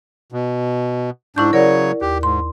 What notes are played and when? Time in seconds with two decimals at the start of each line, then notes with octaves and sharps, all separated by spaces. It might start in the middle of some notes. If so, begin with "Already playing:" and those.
0.32 B2
1.36 G#2 D4 E4 C#6 G6
1.53 C#3 F#3 A#4 C#5 D5 F#5
2.01 D#2 G4
2.23 G#2 C6